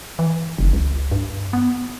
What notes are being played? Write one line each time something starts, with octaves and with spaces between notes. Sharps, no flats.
E3
F#1
C#2
G2
B3